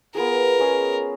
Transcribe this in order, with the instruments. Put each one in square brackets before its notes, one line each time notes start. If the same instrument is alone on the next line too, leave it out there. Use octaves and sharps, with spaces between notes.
[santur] B3 F4 G#4 [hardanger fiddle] A#4
[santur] G#3 C#4 G#4